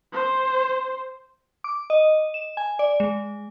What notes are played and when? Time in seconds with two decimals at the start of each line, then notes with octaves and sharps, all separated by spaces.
0.13 C5
1.64 D6
1.90 D#5
2.34 E7
2.57 G#5
2.79 D5
3.00 G#3